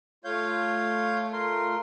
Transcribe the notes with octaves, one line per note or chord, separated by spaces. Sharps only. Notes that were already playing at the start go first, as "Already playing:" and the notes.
A3 F4 C#5 F5 G6
A#4 C6